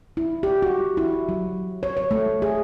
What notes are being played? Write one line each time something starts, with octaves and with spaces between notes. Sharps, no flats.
E4
G4
F#4
E4
F#3
C#5
C#5
A3
G#4